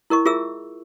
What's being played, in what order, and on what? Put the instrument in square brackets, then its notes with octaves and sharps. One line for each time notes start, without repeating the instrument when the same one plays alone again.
[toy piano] E4 A#4 D#5 C#6
F4 G#4 A#4 E5 E6